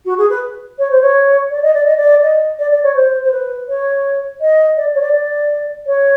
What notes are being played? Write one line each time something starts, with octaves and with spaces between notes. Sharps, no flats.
F#4
G#4
B4
C#5
C5
C#5
D5
D#5
D5
D#5
D5
D#5
D5
D5
C#5
C5
C5
B4
C#5
D#5
D5
C#5
D5
D5
C#5